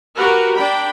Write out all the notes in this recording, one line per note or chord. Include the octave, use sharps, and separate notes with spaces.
F#4 G4 A#4 B4 F#5
D4 G5 B5